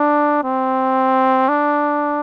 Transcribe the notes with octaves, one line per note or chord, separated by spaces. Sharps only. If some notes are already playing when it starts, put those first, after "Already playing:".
Already playing: D4
C4
D4